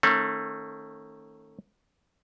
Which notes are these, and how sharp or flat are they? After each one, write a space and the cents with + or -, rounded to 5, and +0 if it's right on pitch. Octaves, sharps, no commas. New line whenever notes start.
D#3 +0 A3 +15 C#4 -35